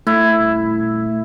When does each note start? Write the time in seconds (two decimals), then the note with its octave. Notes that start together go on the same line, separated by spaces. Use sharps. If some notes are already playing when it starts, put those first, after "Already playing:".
0.07 A3 E4
0.40 D#1